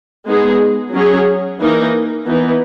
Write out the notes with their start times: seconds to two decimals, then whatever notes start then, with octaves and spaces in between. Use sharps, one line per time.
0.27 G#3 B3 D#4 G#4
0.93 F#3 C#4 G#4 C#5
1.60 E3 A#3 D#4 A#4
2.27 E3 B3 D#4